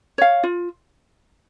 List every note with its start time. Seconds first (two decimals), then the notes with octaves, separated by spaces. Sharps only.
0.18 C#5 F5
0.43 F4